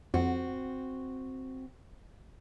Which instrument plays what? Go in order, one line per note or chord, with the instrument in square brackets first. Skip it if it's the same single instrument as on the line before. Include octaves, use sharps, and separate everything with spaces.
[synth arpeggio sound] F2 [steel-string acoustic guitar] C4 F#4